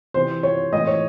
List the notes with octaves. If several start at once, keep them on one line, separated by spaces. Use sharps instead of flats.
C3 E3 C5
C#5
A2 E3 D#5
C#5